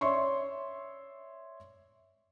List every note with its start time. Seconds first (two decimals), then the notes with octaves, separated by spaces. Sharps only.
0.01 C#5 D5 E5 C6 C#6